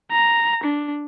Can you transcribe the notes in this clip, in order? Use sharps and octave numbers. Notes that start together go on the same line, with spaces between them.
A#5
D4